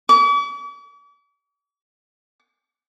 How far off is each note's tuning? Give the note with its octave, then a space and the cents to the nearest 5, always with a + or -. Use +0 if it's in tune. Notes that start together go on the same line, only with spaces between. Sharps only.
D6 -45